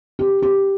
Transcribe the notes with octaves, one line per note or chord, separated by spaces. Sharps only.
G4
G4